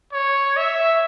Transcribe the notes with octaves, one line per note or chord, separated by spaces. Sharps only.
C#5
E5